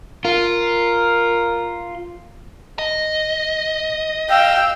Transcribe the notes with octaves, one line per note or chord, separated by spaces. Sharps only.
F4 A#4
D#5
F5 G5 E6